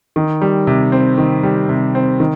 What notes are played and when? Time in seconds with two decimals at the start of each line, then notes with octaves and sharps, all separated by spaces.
0.16 D#3
0.41 G3
0.67 C3
0.92 C4
1.18 D#3
1.43 G3
1.69 C3
1.95 C4
2.20 D#3